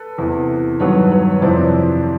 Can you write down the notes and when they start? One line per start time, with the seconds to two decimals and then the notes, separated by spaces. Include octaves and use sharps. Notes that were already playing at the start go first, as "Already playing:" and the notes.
Already playing: A4 B4
0.18 E2 C3 E3
0.80 G2 D#3 F#3 B4 C#5
1.11 B4 C#5
1.31 C#5
1.42 F2 C3 E3 C5 D5